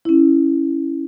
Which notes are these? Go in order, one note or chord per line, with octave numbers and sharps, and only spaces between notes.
C#4 E4